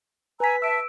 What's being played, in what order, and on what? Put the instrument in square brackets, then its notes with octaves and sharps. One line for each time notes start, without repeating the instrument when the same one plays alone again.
[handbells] B4 B6 [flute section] G#5 A#5 E6
[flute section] E5 A5 [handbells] E6 D7